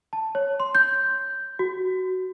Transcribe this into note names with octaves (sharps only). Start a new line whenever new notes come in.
A5
C#5
C6
G6
F#4